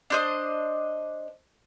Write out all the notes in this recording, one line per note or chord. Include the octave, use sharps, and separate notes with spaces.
D4 C5 D#5